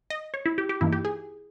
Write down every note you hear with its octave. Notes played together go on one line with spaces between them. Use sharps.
D#5
C#5
E4
G4
G4
G2 E3 A#3 D#4 E4
G4
G#4